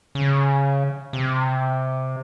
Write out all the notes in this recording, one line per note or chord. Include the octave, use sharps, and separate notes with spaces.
C#3
C3